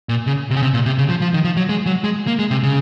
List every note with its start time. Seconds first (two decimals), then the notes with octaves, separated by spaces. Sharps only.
0.09 A#2
0.27 C#3
0.50 C3
0.56 C#3
0.62 C3
0.74 A#2
0.86 C3
0.98 C#3
1.09 F3
1.21 F3
1.33 D#3
1.44 F3
1.57 F#3
1.69 G#3
1.86 F#3
2.04 G#3
2.27 A#3
2.39 G#3
2.51 C3
2.63 C#3